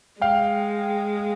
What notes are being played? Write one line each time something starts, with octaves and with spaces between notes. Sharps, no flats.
G#3 F5 G5